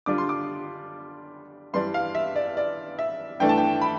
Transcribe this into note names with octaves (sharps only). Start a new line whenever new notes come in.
D3 G3 D4 F4 D6
C6
D6
G2 E3 G3 D4 C6
F5
E5
D5
D5
E5
G2 E3 A3 D4 G5
A5
G5
B5